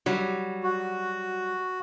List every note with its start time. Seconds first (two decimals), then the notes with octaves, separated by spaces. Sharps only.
0.06 F#3 G3
0.63 F#4